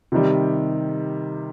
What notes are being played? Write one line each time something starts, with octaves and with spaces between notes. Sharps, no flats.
C3 D#3 G3